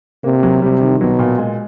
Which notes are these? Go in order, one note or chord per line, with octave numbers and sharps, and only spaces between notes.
C3 A#3
F#3
C3 G3
D#3
B2 F#3
A#2
G#3